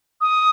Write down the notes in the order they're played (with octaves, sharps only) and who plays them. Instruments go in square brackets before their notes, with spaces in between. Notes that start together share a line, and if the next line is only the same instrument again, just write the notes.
[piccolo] D#6